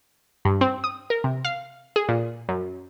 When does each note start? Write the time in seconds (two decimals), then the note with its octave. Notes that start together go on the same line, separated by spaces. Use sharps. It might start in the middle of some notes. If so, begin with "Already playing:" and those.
0.45 G2
0.61 C4
0.84 D#6
1.10 A#4
1.24 C3
1.45 F5
1.96 G#4
2.09 A#2
2.49 F#2